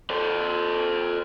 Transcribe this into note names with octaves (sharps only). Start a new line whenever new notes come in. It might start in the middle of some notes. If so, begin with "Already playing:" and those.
A4 C5